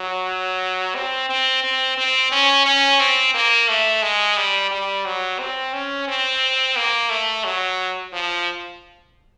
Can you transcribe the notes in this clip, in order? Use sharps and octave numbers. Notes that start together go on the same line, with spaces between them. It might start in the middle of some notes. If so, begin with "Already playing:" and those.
Already playing: F#3
C4
C4
C4
C4
C#4
C#4
C4
A#3
A3
G#3
G3
G3
F#3
C4
C#4
C4
A#3
A3
F#3
F3